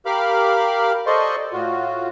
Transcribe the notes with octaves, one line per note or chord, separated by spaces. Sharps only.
G4 A#4 F5 B5 D6 F6
A4 C5 D5 D#5 C6 C#6
A2 F4 F#4